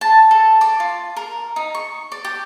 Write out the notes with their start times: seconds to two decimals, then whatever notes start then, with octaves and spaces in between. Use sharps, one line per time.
0.01 A5
0.31 A4
0.61 D5
0.80 F4
1.17 A#4
1.56 D#4
1.75 C#6
2.12 D5
2.25 G4